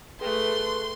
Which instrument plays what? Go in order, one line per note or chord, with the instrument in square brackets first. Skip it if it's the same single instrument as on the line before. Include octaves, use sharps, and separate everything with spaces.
[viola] A3 [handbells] G#4 G5 [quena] B4 [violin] C6